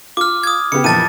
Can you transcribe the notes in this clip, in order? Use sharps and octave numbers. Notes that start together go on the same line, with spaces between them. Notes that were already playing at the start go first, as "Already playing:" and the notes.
F4 D6 F6
D#6 G#6
C#3 B3 G4 C#7
F2 A#2 E3 A5 A6 D#7